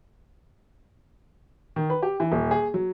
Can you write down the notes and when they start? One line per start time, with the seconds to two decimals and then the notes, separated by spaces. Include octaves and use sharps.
1.76 D#3
1.90 B4
2.03 G4
2.20 E3
2.32 D#1
2.51 G#4
2.74 F#3